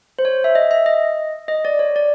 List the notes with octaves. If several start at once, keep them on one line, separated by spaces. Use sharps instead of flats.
C5
C#5
E5
D#5
E5
D#5
D#5
D5
C#5
D5